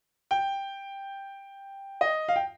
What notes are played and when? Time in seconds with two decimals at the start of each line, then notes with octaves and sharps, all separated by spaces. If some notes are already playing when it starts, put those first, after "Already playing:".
0.31 G5
2.01 D#5
2.29 F5
2.36 G5